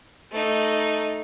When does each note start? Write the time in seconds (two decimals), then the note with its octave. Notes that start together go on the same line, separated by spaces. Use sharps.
0.32 A3 D#4